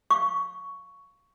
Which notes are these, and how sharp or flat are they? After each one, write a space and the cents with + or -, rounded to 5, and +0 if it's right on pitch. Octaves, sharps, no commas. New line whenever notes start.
F5 +0 C#6 +10